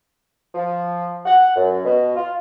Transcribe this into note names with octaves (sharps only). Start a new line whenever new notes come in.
F3
F#5
F#2
B2
F4